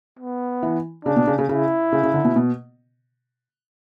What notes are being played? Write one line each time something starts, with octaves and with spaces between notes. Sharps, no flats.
B3
E3
C#3 D4
B2
C#3
C#3
C#3 E4
C#3
C#3
D3
B2
B2